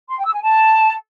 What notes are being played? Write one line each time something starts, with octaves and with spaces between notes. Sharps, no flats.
C6
G5
E6
G#5
A5